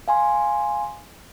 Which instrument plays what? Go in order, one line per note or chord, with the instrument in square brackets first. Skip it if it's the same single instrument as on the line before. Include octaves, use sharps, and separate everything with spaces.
[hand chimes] F5 G#5 C6